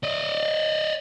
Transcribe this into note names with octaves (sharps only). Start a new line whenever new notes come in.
D5 D#5